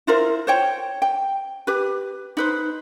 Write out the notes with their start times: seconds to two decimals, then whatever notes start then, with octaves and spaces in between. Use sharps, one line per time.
0.07 E4 F4 A#4 C5
0.47 C5 C#5 G5
1.02 G5
1.67 G4 B4
2.37 D#4 B4 C5